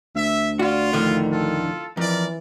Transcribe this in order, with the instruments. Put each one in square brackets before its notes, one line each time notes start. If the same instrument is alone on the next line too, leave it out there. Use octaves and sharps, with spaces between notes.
[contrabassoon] D2 [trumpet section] E5
[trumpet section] F4 [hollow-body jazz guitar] F#4 [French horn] D5
[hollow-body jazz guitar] F2 A2 D3 [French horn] D#3
[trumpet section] F4 A4
[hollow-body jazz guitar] F2 [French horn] E3 [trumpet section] A#4 D5